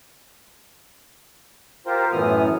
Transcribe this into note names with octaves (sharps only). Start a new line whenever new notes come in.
F4 G4 A#4 C5
F#2 A2 E3 B3 D#6 F6